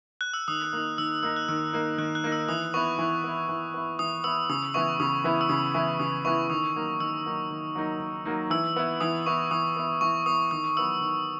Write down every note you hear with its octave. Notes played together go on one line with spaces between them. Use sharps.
F#6
E6
D#3 D#6
A#3 D#4
D#3 E6
A#3 D#4 E6
F#6
D#3 E6
A#3 D#4
D#3 F#6
F#6
A#3 D#4
E6
E3 D#6
B3 E4 C#6
E3
B3 E4
E3
B3 E4
E3 D#6
B3 E4 E6
C#3 D#6
E3 B3 E4 C#6
C#3 D#6
E3 B3 E4
E6
C#3 D#6
E3 B3 E4 C#6
C#3 D#6
E3 B3 E4 C#6
D#3 D#6
F#3 A#3 D#4
D#3 E6
F#3 A#3 D#4
D#3
F#3 A#3 D#4
D#3
F#3 A#3 D#4
E3 E6
B3 E4
E3 D#6
B3 E4 C#6
E3 D#6
B3 E4
E3 C#6
B3 E4 D#6
D#3 D#6
F#3 B3 E4 E6
D#3